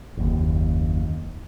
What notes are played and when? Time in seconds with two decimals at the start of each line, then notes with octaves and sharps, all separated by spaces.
0.17 F#1 D#2